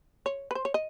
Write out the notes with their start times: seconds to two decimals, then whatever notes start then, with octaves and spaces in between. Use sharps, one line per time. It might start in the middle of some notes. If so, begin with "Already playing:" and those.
0.26 C#5
0.51 B4
0.55 C5
0.65 C#5
0.74 D#5